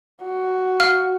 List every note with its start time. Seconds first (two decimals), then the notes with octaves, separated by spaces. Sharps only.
0.24 F#4
0.80 F5 F6